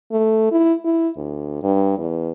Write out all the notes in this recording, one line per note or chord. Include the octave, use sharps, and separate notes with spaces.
A3
E4
E4
D2
G2
E2